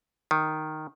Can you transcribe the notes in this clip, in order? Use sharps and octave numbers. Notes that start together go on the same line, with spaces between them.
D#3